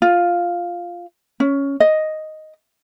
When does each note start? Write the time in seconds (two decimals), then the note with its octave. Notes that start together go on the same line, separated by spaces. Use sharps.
0.02 F4
1.40 C#4
1.80 D#5